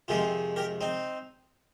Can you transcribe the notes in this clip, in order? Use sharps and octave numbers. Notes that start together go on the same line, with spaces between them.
F2 C3 D#3 G#3 F4 G#4
G4 A#4
C4 D#4